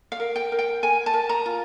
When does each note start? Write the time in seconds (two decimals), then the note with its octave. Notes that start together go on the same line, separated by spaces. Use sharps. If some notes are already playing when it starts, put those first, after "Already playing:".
0.12 F5
0.20 A#4
0.36 G5
0.52 A#4
0.59 G5
0.83 A#4 G#5
1.06 A5
1.14 A#4
1.29 A#5
1.46 F4